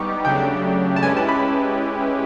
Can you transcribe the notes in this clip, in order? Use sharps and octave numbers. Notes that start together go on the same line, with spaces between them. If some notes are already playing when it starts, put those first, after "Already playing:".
Already playing: G3 B3 D#4 G4 C#6 D6
C#3 F#3 A3 D4 G4 G5
A5
G#3 C#4 E4 G4 B4 G#5
A5
B5